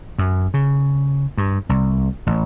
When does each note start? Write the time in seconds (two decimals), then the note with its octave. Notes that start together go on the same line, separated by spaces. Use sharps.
0.18 F#2
0.54 C#3
1.38 G2
1.69 C2
2.27 A1